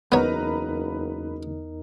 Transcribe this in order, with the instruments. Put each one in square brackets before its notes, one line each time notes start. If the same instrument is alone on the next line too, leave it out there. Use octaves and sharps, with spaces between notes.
[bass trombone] F#1 [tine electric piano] E2 D#4 A#4 [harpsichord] B3 C#5 [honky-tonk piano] B4 A#5